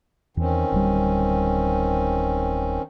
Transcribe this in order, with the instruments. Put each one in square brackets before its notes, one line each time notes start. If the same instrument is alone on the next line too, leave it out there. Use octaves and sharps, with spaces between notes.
[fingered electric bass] E2 [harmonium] D#3 C4 C#4
[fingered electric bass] D1 G3